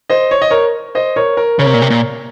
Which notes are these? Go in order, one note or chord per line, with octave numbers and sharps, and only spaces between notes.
C5 D#5
C#5
D#5
A#4 C#5
C5 D#5
A#4 C#5
A#4
C#3 A#4 C#5
C3
A#2
C3
A#2